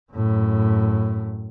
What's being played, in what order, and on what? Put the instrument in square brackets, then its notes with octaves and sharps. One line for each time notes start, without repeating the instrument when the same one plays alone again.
[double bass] F#2 A2